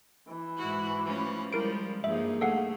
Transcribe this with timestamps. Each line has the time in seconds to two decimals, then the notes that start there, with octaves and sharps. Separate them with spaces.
0.27 E3
0.58 G#2 E4 F#4
1.03 F3 A3 C#4
1.53 F3 G3 G#3 E4 A#4 D7
2.04 G2 F3 A#3 D#4 G#4 E5
2.41 A3 A4 F5 F#5